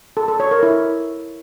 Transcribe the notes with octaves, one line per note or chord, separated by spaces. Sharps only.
A4
A4
C#5
A#4
E4